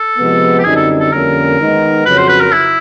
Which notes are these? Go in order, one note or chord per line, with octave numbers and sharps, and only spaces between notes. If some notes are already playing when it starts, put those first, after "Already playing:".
Already playing: A4
C3 F3 G#3 B3
G4
F#2 D3 G3 C4 D#4 G#4
A4
A4
F2 D3 G3 A#3 C#4 A#4
D#3 G#3 B3 D#4
F2 C#3 F#3 B4
C5
B4
A#4
E4